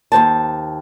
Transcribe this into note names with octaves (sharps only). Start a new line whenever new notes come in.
D#2 D#3 C5 A5